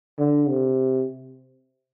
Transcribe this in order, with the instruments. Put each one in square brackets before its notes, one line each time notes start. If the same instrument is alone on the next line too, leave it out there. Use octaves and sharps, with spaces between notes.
[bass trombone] D3
C3